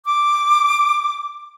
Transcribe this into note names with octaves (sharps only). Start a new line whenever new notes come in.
D6